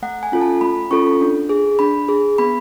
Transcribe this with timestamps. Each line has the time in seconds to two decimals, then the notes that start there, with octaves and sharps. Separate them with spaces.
0.02 A3 F#5
0.23 G#5
0.32 C#4 F4 A4
0.41 A5
0.61 A3 B5
0.91 C#4 F4 A4 C#6
1.21 D4
1.49 G#4
1.79 D4 B5
2.08 G#4
2.38 B3 B5